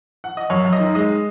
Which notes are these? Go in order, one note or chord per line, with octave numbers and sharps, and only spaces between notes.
F#5
D#5
F#2 C#5
F#2
D#5
D#3
G#3 D#5